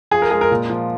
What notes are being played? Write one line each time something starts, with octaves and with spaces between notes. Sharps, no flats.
F3 G#4
A#4
G#3 G#4
A#4
A#2
F3